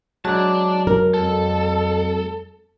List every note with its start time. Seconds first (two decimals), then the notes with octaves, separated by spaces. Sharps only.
0.25 F#3 G#3 D5 A5
0.87 A#4
1.14 F2 A4